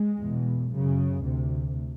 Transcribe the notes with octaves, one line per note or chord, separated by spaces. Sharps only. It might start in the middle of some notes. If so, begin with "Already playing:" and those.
Already playing: G#3
E2 B2
F#2 C#3
D2 C3